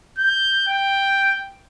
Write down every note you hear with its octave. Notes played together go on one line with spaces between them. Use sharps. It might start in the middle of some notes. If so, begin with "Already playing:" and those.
G6
G5